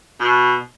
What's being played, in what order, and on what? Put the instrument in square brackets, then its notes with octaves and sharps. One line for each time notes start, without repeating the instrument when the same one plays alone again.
[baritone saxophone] B2